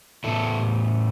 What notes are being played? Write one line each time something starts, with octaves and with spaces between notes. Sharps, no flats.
A2 E3 B3 E4 A4